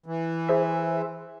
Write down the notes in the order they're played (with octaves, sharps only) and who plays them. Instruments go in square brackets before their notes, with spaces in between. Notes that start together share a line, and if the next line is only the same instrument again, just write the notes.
[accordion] E3
[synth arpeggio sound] G#4 C5 E5